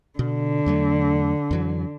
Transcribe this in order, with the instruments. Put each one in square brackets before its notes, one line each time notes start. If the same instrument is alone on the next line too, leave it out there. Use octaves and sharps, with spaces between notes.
[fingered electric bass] B2 [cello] D3
[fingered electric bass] E2 F#3 A3
F2 E3 F#3